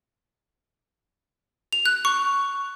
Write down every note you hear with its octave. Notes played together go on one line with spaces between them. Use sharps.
F7
F#6
C#6